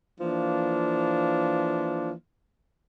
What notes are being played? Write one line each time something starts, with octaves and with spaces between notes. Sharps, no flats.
E3 F3 A#3 D4